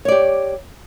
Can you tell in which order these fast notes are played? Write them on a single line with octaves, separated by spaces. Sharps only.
C#5 D5 G4